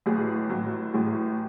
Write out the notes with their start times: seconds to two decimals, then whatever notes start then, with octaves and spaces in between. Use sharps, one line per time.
0.06 A1 A2 F#3 G#4
0.50 A1 A2 F#3
0.93 A1 A2 F#3 G#4